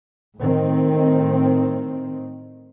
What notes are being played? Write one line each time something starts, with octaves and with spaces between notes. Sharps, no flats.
A2 D#3 C4